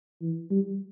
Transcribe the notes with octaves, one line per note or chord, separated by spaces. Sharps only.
E3
G3